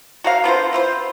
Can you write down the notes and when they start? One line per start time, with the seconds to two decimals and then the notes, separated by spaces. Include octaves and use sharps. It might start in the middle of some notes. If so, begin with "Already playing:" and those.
0.24 F#4 A#4 F5
0.44 D3 B3 F4 C5
0.73 E4 F4 C5